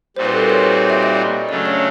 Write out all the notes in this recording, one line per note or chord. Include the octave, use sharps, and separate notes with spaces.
A#2 G3 C4 D#4 F#4 C5
B4
A4
A#4
C#5
E5
D#5
D5
C#3 F#3 A3 D4 D5
C#5